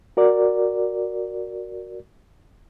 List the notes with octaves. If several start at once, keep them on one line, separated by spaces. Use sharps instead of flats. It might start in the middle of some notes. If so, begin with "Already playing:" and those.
F#4 A#4 D5